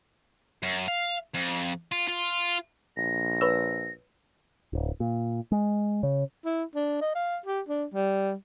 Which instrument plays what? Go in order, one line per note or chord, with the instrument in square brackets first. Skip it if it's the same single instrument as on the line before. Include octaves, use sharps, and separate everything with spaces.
[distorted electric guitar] F#2
F5
F2
F4
F4
[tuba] A#1 [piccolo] A#6
[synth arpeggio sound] B4 C#5 E6
[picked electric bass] D1
A#2
G#3
C#3
[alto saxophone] E4
D4
D#5
F5
G4
D4
G3